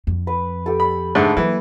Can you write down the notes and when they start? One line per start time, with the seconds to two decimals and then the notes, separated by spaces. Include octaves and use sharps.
0.07 F2
0.27 B4
0.66 G4 A4
0.80 B5
1.15 G#2 D3 A3
1.37 E3 F#3 A#3 G5